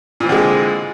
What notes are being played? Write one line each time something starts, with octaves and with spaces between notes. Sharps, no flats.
A#2 D3 E3 G#3 C4